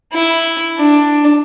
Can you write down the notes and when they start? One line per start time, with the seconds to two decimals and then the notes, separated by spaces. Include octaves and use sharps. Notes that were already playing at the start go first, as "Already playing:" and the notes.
0.13 E4
0.79 D4